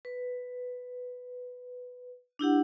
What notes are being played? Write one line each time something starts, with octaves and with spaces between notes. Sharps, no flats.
B4
D4 E4 G4 F#5